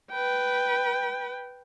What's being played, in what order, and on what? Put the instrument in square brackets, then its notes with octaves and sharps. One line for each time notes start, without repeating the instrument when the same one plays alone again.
[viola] B4 G5